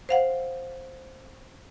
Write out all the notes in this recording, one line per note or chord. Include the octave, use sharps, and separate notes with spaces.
C5 F5 F#5